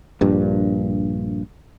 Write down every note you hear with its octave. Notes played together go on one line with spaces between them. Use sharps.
A#1 G2